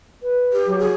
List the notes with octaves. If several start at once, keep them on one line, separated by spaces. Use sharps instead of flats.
B4
G4
F#3
G#4